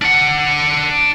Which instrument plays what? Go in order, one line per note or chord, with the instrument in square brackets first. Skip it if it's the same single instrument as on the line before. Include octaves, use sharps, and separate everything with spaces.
[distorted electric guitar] D4 F#5